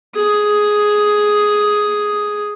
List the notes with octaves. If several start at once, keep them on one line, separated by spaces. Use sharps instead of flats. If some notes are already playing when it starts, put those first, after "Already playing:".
G#4 D#6